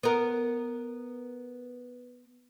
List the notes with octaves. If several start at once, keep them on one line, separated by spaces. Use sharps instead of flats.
B3 A#4